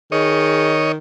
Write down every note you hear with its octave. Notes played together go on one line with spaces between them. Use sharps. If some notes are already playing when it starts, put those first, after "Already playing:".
D#3 G#4 C#5 D#5